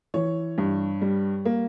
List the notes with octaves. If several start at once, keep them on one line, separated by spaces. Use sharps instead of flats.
E3 C#5
G2
G3
A#3